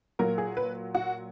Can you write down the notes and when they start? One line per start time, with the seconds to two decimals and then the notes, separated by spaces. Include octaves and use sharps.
0.19 A#2 F#3 A#3 A#4
0.38 G#4
0.57 B4
0.95 F#4